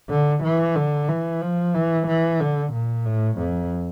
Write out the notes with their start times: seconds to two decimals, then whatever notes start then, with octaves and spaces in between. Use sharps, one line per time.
0.10 D3
0.44 E3
0.76 D3
1.09 E3
1.42 F3
1.75 E3
2.08 E3
2.41 D3
2.73 A#2
3.06 A2
3.39 F2